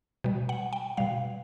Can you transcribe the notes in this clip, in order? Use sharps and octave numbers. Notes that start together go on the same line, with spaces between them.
B2 G3
F#5
G5
B2 G3 F5